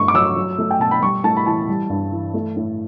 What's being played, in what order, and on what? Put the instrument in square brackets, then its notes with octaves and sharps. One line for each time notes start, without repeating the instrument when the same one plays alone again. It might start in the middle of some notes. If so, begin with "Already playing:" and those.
Already playing: [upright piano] G2 A3 C#6
D6
F#3 E6
F#3
A3
G5
B2 A5
B5
G3 C#6
A2 A5
B5
E3 A5
G3
G2
E3
A3
A2